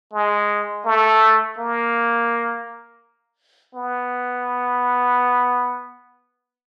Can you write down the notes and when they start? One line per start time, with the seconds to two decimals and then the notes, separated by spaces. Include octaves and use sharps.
0.13 G#3
0.85 A3
1.58 A#3
3.75 B3